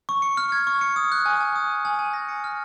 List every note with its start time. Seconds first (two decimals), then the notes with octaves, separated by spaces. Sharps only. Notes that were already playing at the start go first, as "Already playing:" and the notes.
0.09 C#6
0.22 C#7
0.37 F6
0.52 G#6
0.67 C#6
0.81 C#7
0.96 D#6
1.12 F#6
1.26 G#5
1.40 G#5
1.56 D#6
1.70 F#6
1.85 G#5
1.99 G#5
2.14 A#6
2.28 C#7
2.44 F6